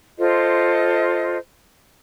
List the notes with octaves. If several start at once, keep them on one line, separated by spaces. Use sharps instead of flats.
F4 A4 C5 D#5